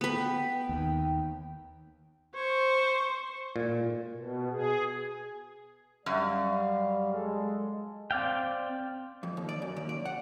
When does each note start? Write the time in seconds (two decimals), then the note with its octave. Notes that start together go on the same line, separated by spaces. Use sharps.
0.01 B3 B4 G5
0.69 D#2
2.35 C5 C#6
3.56 A#2
4.11 B2
4.51 G#4
6.06 F#2 G3 D5 F5
7.13 G#3 A4
8.11 C4 D5 F5 G5
9.23 F2
9.37 D#2
9.49 D5
9.62 F#2
9.76 D#2
9.89 D5
10.05 F#5